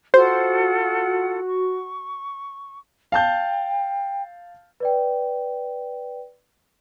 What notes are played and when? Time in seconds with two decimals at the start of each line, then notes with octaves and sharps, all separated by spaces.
0.14 F4 F#4 A4 C5 F#5
1.45 C#6
3.12 F5 G5 A5 G6
4.80 B4 D5 G5